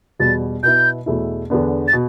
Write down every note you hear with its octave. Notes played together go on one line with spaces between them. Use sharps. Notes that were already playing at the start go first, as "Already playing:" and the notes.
E2 B2 G3 A6
B2 B3 E4 G6
E2 B2 A3 E4
E2 D3 B3 D4
A6
B2